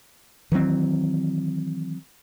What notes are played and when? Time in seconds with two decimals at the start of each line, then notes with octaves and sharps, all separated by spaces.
0.52 D#3 E3 F#3 C4